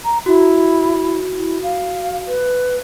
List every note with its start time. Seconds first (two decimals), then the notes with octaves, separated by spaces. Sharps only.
0.04 A#5
0.26 E4 F#4
1.36 E4
1.62 F5
2.27 B4